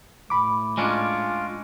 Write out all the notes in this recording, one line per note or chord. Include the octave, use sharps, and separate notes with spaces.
A2 B5 D6
G#3 C#4 D4 F4